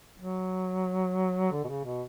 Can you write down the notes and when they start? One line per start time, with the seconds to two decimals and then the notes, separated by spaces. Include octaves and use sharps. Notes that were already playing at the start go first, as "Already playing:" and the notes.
0.20 F#3
1.52 D3
1.64 B2
1.68 C#3
1.85 B2